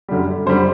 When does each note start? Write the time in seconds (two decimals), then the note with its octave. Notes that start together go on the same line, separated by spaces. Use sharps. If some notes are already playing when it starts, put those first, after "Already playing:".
0.09 F#2 D3 G3
0.46 F#2 D3 G3 C5